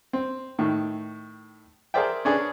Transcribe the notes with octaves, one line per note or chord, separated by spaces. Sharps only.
C4
A2 D#3
G#4 A#4 C5 D5 E5 G5
C#4 D4 G#4 B4